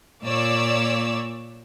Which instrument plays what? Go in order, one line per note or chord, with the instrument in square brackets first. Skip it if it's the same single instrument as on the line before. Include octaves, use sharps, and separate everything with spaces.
[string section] A#2 C#5 D5 E6